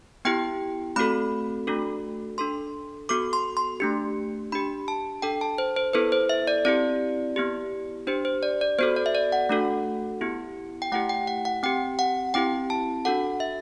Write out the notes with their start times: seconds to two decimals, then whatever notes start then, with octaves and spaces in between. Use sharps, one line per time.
0.25 B3 E4 G4 G5
0.96 A3 C4 F#4 A4 B5
1.67 A3 D4 F#4 A4
2.38 D4 A4 C6
3.09 B3 F#4 A4 D6
3.33 C6
3.57 C6
3.80 A3 D4 G4
4.52 D4 G4 B5
4.88 A5
5.22 D4 A4 G5
5.41 A5
5.58 C5
5.76 C5
5.93 B3 E4 A4 B4
6.12 C5
6.29 E5
6.47 D5
6.65 C4 E4 G4 D5
7.36 B3 E4 G4
8.07 D4 G4 C5
8.25 C5
8.43 D5
8.61 D5
8.79 B3 F#4 A4 C5
8.96 D5
9.06 E5
9.15 D5
9.32 F#5
9.49 A3 D4 F#4 A4
10.21 B3 E4 G4
10.82 G5
10.92 A3 E4 G4 F#5
11.09 G5
11.27 F#5
11.45 F#5
11.63 C4 G4 G5
11.99 F#5
12.34 C4 E4 G4 G5
12.70 A5
13.05 D4 F#4 A4 F#5
13.40 E5